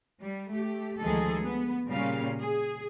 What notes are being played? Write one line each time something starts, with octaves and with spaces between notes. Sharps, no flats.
G3
A3 G4
D2 D#3 F3 G#3 G#4 A4
B3
A#2 C#3 G3 C#4 F5
G#4